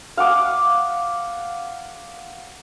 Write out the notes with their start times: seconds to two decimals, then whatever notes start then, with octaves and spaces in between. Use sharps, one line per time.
0.17 F5 F#5 D6 D#6